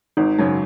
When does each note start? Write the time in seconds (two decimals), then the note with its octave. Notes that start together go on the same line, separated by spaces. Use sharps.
0.17 G#1 D#4
0.38 F#2 C#3 F#3